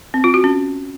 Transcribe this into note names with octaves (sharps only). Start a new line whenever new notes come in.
C4
F4
F#4
C#4